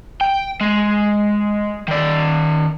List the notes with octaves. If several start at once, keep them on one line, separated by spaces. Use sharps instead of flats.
G5
G#3
D#3 D5